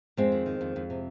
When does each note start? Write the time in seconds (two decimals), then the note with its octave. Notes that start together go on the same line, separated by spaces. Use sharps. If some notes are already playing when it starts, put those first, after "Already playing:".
0.17 F2 G#3 C4
0.32 D#3
0.46 D#3
0.61 F2
0.76 F2
0.90 C3